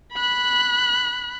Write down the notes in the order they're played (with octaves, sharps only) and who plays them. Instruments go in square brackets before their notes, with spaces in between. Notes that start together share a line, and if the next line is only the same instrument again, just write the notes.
[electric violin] B5 F#6